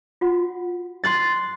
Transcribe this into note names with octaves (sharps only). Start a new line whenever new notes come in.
F4 F#4 F#5
C6 F#6 A6